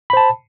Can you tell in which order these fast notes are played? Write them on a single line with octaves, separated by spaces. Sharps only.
B5 C5 A5